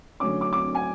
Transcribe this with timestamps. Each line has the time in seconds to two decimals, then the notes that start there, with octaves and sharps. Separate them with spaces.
0.20 D3 F#3 A3 C#4 D6
0.41 D6
0.53 D6
0.75 G#5